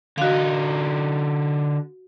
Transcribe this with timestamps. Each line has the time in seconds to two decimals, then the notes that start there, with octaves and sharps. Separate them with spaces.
0.18 D3 D#4 F#4 F5